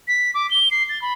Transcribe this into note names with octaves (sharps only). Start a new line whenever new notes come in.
B6
D6
G7
C7
A6
B5